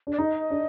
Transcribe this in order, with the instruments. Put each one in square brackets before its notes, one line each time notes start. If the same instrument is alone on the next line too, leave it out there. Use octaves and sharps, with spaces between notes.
[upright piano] D4
[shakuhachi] D5
[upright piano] D#4 [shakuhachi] D#5
[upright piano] D4